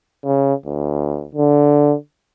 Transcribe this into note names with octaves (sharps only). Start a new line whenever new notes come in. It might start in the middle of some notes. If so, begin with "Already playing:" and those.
C#3
D2
D3